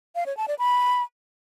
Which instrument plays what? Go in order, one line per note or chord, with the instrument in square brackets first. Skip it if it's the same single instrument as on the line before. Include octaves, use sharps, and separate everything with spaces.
[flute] F5
C#5
A5
D5
B5